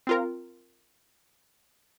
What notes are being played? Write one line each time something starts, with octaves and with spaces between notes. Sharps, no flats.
C4 F4 A#4